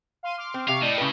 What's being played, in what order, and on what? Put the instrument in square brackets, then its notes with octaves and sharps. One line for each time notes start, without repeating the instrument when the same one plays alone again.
[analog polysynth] F5 C6 D#7
C6 D6 F6
[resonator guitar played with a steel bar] C4
[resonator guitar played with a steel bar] C3 [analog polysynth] G4 C#6 [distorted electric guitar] F5
[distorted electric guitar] A2 [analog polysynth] D5 D#5 G5
[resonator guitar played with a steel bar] C#3 B4